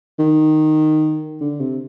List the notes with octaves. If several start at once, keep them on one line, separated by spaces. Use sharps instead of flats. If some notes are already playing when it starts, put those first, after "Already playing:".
D#3
D3
C3